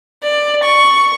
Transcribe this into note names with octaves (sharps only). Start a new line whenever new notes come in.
D5
C#6